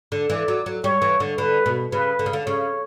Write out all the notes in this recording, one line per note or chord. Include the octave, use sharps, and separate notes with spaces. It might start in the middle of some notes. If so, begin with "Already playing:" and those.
D3
E3 D5
F#3
F#3
G3 C#5
E3
D3
D3 B4
B2
C#3 B4
D3
C#3
D3
C#3 C#5